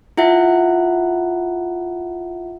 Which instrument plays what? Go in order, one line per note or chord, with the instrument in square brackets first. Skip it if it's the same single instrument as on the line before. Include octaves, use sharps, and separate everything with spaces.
[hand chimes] E4 F4 E5 F#5